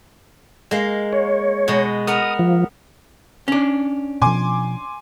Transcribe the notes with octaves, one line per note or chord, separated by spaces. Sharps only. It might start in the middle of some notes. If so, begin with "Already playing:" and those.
G#3 A#3
C#5
B2 G#3
B3 A#4 A#5 D#6
F3
C#4 D4
B2 F3 G#5 C6 D6